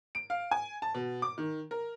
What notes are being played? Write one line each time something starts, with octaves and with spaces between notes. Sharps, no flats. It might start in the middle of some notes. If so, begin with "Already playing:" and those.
D7
F5
G#5
A5
B2
D6
D#3
A#4